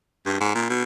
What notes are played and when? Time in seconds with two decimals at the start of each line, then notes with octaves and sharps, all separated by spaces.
0.26 G2
0.40 G#2
0.55 A#2
0.70 B2